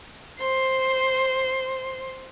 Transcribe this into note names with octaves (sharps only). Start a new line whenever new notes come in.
C5 C6